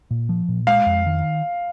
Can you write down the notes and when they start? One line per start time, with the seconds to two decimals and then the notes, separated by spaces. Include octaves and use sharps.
0.11 A#2
0.29 F3
0.49 A#2
0.67 G#3 F5
0.86 F2
1.06 D#3